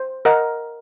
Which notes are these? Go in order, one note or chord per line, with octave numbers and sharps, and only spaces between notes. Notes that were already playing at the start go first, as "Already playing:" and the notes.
Already playing: C5
A#4 D#5 F#5